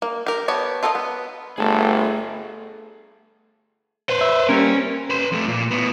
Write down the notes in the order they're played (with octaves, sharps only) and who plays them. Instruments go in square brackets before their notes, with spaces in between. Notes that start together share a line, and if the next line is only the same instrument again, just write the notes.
[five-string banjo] A#3
G4 A#4
B3 G4 C#5 A5
F4 A4 A#4 C#5 D#5
B3
[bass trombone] G1 [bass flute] A3 [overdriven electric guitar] G#4 A5
[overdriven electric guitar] B4 C5
[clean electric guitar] E5
[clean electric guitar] G3 A#3 A#4 [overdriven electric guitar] C#4
[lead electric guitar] B4 C6
F2 A3
A#2
A2 B3